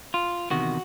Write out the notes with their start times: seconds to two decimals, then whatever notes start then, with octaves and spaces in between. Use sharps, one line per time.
0.14 F4
0.50 E2 C3 D#3 F#4